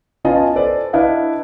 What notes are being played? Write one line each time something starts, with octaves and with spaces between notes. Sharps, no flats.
B3 C#4 F4 D#5 G#5 A5
A4 B4 C5 D5
D4 E4 B4 D#5 F5